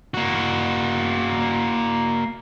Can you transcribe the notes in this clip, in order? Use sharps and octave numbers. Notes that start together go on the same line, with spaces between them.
A#3 F#4